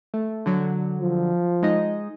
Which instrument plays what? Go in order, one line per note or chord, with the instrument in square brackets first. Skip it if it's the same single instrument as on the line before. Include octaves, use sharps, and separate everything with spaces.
[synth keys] A3
D3 F#3
[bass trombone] F3
[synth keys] G#3 D#4 D#5